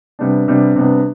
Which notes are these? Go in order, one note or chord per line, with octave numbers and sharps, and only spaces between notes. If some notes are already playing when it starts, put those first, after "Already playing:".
C3 G3 B3 D4
C3 G3 B3 D4
C3 G3 B3 D4